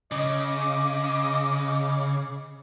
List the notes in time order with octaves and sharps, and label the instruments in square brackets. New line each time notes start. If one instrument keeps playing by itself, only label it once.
[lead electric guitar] C#3 [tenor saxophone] D#5 [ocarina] D6